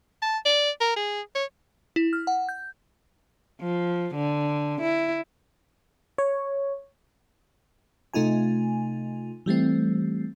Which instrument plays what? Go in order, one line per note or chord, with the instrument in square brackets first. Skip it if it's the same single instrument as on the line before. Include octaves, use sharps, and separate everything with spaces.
[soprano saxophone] A5
D5
A#4
G#4
C#5
[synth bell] E4
F6
F#5
G6
[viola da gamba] F3
D3
E4
[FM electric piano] C#5
C3 A3 D#4 F4 G#5
E3 G3 A3 C4